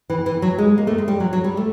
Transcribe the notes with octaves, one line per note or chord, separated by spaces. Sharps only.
E3
E3
F#3
G#3
A#3
A3
G#3
G3
F#3
F#3
G3
A3